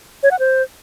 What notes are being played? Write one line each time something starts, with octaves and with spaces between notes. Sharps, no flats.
C#5
F#5
C5